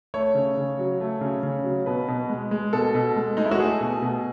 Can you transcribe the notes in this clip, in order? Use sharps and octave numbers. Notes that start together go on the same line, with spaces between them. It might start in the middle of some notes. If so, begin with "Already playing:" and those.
A3 C#5
C#3
C#3
F#3
A3
C#3
C#3
F#3
B2 B4
B2
G#3
G#3
B2 A4
B2
G#3
G#3 D#4
E4
F#4
A3 G#4
B2
B2